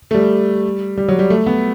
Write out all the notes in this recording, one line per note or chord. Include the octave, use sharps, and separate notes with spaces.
A3
G3
G3
F#3
G3
A3
B3